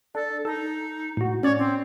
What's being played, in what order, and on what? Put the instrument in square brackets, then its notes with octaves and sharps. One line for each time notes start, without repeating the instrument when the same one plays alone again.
[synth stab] D4 [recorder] A4
[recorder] D#4 [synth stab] A4
[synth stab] A2 F#4
[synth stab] C#4 D5 [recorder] C#5
[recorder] C4